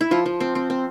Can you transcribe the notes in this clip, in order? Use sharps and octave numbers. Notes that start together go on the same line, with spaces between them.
E4
F3 F4
F3
C4
C4
C4